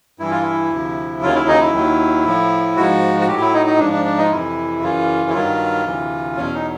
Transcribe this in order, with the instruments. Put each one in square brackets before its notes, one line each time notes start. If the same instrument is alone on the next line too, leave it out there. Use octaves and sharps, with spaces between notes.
[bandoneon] G2 E3 E4
F4
E4
D2 C3 F3
D#2 C#3 F#3 F4
E4
D#4
E4
D#2 D#3 F#3
A2 F3
G#2 F3 F#4
F#4
A2 F#3 G4
E4
D#4
D#4
G#2 D4
F3
D4
D4
D#4
F4
F2 C3 E3 E4
F#2 C#3 E3 F4
E4
G2 D#3 F#3 F4
D2 C3 E3
E2 B2 F#3 C#4
D#4